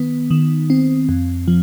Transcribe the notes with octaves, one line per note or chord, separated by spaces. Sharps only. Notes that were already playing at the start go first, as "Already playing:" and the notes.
Already playing: D#3 B3
D#3
C4
F2
F3